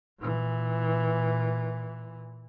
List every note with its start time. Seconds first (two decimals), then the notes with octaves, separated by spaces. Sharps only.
0.20 A#2 E3